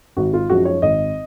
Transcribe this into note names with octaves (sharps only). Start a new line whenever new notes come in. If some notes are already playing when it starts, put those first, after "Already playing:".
G#1 F#4
F4
F#2 F3 G#3 D#4 F#4
C#5
G#1 D#5